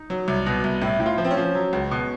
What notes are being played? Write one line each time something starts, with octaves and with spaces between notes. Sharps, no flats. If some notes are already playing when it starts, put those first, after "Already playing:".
Already playing: D#4
F#3
C2
B2
C2
A2 E4
A2
F4
F3
C4
C#4
F3
F#3
C#2
B2